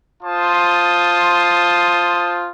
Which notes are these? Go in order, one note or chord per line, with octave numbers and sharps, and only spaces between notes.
F4 C5 A5 C6 D#6